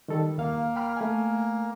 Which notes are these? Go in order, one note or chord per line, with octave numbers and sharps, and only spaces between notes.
D#3 G3 A4
D#2 A#3 F5
G5 B5 F6
A3 G#5